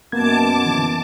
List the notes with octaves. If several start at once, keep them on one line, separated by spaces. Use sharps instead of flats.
F#2 B2 A#3 B3 A5 D6 G#6
D3 E3